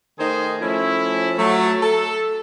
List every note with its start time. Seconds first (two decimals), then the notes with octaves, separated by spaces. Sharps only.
0.19 D#3 A3 D#4 G#4 C5
0.60 F3 A3 C#4 E4
1.38 F#3 A3
1.82 A4